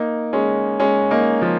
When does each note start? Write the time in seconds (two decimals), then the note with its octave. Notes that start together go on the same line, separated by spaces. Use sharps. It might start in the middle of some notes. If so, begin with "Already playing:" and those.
Already playing: A#3 D#4
0.33 G#3 C#4
0.80 G#3 C#4
1.10 A#3 D#4
1.42 F3 A#3